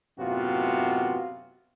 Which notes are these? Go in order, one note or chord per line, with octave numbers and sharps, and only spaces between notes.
F#2 A2 C3 B3 F4 F#4